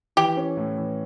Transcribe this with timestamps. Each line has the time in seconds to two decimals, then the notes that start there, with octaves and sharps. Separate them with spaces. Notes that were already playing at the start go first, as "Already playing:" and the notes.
0.17 E3 G4
0.37 C#4
0.57 A2
0.77 E3